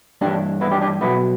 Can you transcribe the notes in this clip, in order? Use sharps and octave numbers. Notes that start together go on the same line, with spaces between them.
G2 E3 D4 G4
B3 E4
D4 G4
D4 G4
B1 B2 B3 E4